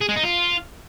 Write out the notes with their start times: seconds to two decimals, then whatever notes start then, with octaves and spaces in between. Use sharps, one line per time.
0.01 G#4
0.09 G#3
0.16 D#4
0.24 F4